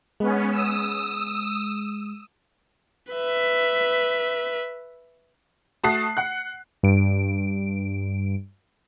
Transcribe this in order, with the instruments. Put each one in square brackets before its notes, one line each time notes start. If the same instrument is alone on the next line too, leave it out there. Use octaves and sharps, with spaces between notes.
[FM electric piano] G#3 [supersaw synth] B3 C#4
[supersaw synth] D#6 E6
[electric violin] B4 E5
[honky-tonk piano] A3 F#4 A5 D#6 F#6 C7
F#5 F#6
[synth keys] G2 D7